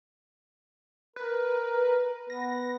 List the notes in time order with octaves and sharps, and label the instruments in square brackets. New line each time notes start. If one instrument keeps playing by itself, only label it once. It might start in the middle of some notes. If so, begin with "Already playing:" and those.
[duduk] A#4 [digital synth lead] B4
[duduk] B3 [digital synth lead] A#6